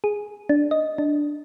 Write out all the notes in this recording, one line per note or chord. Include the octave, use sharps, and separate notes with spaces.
G#4
D4
D#5
D4